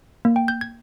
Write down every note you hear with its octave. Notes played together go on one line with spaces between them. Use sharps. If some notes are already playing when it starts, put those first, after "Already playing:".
A#3
G5
G6
G#6